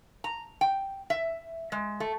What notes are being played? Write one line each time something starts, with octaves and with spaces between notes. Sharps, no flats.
A#5
G5
E5
G#3
A3